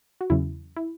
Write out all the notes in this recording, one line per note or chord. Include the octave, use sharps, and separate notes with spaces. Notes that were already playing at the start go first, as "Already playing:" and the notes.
F#4
E2 C#3 F#3 C#4 E4
E4